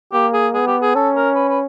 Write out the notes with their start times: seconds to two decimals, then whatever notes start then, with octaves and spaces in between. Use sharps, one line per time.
0.13 A#3 G4
0.33 G#4
0.54 B3 G#4
0.67 G4
0.82 G#4
0.95 C#4 A4
1.16 A#4
1.35 B4
1.49 B4